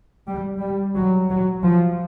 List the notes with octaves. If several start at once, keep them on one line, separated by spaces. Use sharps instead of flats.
G3
G3
F#3
F#3
F3